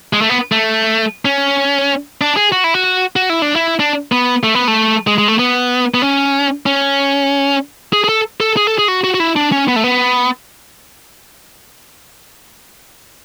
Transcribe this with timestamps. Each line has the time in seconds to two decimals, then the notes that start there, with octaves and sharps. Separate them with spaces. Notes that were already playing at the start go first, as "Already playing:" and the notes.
0.13 G#3
0.22 A3
0.30 B3
0.52 A3
1.25 C#4
2.21 D4
2.37 G#4
2.52 F#4
2.64 E4
2.74 F#4
3.16 F#4
3.30 E4
3.42 D4
3.56 E4
3.80 D4
4.12 B3
4.43 A3
4.55 B3
4.68 A3
5.07 G#3
5.18 G#3
5.28 A3
5.39 B3
5.94 B3
6.02 C#4
6.66 C#4
7.93 G#4
8.04 G#4
8.09 A4
8.40 A4
8.57 G#4
8.67 A4
8.79 G#4
8.88 F#4
9.04 F#4
9.14 F#4
9.20 E4
9.36 D4
9.52 C#4
9.68 B3
9.76 A3
9.84 B3